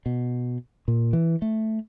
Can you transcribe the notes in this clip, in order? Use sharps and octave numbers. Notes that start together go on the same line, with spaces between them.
B2
A#2
E3
A3